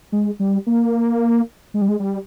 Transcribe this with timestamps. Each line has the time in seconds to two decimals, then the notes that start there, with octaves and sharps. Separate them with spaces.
0.12 G#3
0.39 G3
0.67 A#3
1.74 G#3
1.81 G3
1.88 G#3
2.00 G3